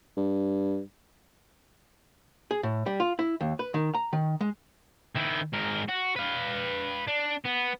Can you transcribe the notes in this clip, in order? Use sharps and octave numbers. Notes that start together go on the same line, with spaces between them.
G2
G#4
A2
G3
F4
E4
D#2
B4
D#3
A#5
D#3
G#3
D#3 E4
G#2 A#4
F#4
B4 F5
D4
B3